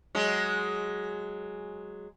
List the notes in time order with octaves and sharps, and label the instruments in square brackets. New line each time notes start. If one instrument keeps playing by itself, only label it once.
[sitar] F#3 G#3